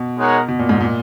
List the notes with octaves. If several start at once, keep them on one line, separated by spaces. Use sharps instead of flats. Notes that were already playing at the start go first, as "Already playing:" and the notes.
Already playing: B2
G#3 D#4 A#4 C#5 F#5
B2
A#2
G#2
A#2